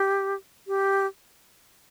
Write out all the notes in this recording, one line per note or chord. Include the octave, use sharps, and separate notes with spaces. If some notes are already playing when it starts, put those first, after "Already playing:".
Already playing: G4
G4